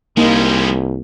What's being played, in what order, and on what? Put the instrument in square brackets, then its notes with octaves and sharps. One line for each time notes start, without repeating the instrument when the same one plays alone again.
[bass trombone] C2 [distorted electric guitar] G3 G#3 [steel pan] A#3 D#4